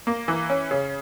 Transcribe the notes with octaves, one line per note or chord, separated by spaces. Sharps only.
A#3
E3
C#4
C#3